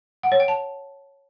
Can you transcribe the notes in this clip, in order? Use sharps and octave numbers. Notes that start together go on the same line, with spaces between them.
F#5
C#5
G5
A5